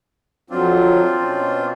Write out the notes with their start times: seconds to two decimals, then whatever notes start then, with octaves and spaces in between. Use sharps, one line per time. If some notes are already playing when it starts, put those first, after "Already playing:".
0.50 F2 F#3 C4 D4 F4
1.19 B2 C#4